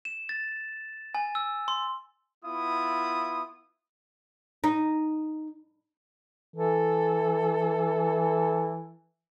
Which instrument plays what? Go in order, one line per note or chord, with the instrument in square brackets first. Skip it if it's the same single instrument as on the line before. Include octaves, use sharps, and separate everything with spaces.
[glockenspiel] E7
A6
G#5
E6
C6
[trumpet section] B3 E4 F4 D#6
[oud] D#4
[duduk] E3 [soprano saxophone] A4